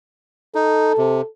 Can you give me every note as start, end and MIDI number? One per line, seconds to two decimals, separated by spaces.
0.55 0.93 63
0.55 1.27 69
0.98 1.21 48